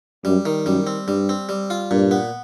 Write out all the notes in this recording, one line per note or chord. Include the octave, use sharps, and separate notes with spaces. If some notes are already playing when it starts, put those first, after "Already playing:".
F#2 G3
D#3
F#2 G3
C4
G2 G3
C4
G3
F4
G2 A#2
B3